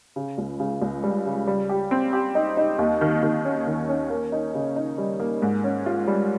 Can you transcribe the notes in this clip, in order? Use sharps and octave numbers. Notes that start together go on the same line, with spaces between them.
C#3
C#2
C#3
C#2
G3
C#3
G3
G4
C4
G4
D#4
D#4
D#2
D#3
D#3
C#4
D#3
C#4
A#3
D#4
C#3
D#4
G3
A#3
G#2
C#4
F4
G3